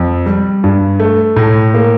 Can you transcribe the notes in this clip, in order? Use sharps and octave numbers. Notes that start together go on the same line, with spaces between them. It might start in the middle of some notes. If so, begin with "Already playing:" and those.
Already playing: F2
G3
G2
A3
A2
A#3